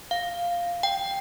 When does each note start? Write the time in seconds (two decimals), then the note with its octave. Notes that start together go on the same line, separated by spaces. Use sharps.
0.11 F5
0.83 G5